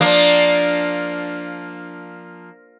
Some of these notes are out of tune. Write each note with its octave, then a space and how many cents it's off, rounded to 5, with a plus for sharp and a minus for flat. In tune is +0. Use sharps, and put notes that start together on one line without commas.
F3 +10 A#3 +0 D4 +0